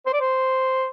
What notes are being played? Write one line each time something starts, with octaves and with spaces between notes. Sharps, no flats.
C5
D5
C5